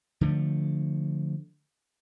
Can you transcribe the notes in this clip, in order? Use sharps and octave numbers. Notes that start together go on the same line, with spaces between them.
D3 F3 A3